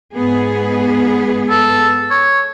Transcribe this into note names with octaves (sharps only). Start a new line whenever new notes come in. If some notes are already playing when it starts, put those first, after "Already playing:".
G#2 B3 G#4
A4
C#5